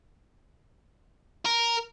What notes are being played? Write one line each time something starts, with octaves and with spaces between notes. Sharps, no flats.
A#4